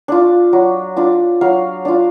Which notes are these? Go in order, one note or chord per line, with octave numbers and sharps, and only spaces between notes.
D4 F4
F#3
D4 F4
F#3 F5
D4 F4